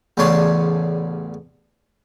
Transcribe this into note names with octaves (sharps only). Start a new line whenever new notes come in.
A1 E2 C#3 D4 C#5 C6